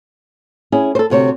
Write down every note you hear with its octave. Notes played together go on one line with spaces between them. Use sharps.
C#4 E4 G#4
A4 C5
D2 C3 C#5